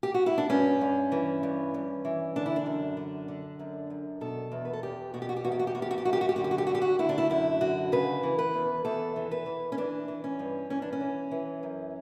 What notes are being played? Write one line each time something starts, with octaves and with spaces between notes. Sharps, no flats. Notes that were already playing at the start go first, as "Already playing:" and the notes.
G4
F#4
E4
D4
G2 C#4
G2
E3
G2
G2
E3
D3 D4
E4
D4
F#2
D3
D3
F#2
F#2
B2 A4
E2
B4
A4
E2 G4
B2 F#4
G4
F#4
G4
E2 F#4
G4
F#4
G4
E2 F#4
G4
F#4
G4
F#2 F#4
G4
F#4
G4
D3 F#4
G4
F#4
G4
D3 F#4
G4
F#4
D3 E4
D4
E4
F#2 E4
D3 F#4
C#3 B4
E3
B4
E2
E2 A4
E3
B4
E3
C#4
E3 D4
E3
C#4
G2
E3 C#4
D4
C#4
E3
E3
F#2